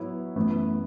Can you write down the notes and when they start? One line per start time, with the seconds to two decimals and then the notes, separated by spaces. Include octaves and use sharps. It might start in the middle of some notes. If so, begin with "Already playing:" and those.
Already playing: F#3 B3 E4 C#5
0.36 F#2 E3 A3 B3